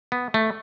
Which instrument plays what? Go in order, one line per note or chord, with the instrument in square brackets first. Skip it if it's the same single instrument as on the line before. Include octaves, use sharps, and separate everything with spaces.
[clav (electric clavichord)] B3
A3